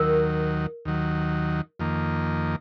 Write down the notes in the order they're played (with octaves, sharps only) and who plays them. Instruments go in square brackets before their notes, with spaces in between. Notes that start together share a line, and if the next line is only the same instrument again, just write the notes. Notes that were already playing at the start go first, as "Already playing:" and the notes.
Already playing: [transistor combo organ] D#2 D#3 F#3 [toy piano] A#4
[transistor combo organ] D#2 D#3 F#3
F2 D#3 A#3